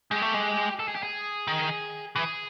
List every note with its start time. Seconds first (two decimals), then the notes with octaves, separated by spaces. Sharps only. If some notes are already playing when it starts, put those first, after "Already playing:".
0.11 G#3 G4
0.22 A3
0.34 G#3
0.79 A4
0.88 G#4
0.95 G4
1.03 G#4
1.48 D#3
2.16 E3 G#4